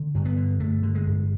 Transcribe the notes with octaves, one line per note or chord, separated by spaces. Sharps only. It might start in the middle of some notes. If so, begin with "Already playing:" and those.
Already playing: D3
G2
B3
D3
G2 A3
D3
G#3
G2